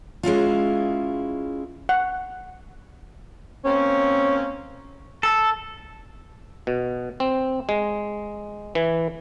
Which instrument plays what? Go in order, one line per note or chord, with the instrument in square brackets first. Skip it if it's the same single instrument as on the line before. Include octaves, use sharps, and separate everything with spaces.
[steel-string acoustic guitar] G#3 C#4 E4 F4
[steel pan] F#5
[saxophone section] A#3 C4 C#4
[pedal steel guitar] A4
[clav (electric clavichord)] B2
C4
G#3
E3